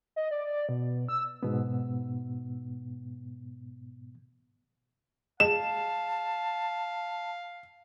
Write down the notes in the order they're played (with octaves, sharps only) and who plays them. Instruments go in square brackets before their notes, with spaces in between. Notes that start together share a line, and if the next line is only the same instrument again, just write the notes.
[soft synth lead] D#5
D5
B2
E6
[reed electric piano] G#2 B2 B3
[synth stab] G#3 [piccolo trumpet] F5 [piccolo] A5 [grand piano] E7